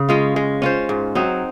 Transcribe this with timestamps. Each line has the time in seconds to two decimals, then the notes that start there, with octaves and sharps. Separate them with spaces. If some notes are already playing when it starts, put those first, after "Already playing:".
Already playing: C#3
0.09 G#3 C#4 F4
0.36 G#3
0.62 C#4 F4 C5
0.89 G#2
1.15 F#3 C4 D#4